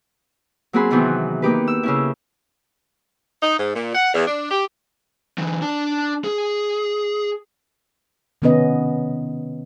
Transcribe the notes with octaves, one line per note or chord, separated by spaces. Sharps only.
F#3 A#3 C4 F#4 G#4 B5
C3 D#3 E3 F#3 B3 C4
A#3 D#4 G4 B4
E6
C#3 C#4 E4
D#4
G#2
A#2
F#5
E2
D4
G4
D3 E3
D4 A5
G#4
C3 D#3 B3 C#4 B4 D#5